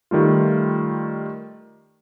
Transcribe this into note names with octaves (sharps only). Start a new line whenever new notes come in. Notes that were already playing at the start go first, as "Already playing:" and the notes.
D#3 G3 A3 F4